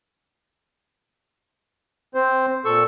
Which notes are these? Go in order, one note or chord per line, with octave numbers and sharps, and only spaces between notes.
C4 C5
A#2 A4 C#6 E6